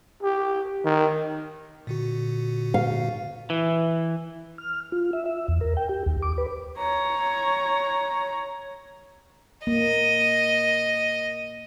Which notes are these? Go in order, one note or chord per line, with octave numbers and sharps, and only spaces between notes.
G4
D#3
A#2 D3 F#4
F5
E3
F6
F4
E5
E5
E2
A#4
G5
G4
D#2
D6
B4
C#5 A#5
A#3 D#5